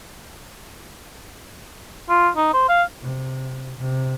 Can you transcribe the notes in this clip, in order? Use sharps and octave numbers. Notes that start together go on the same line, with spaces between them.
F4
D#4
C5
F5
C3
C3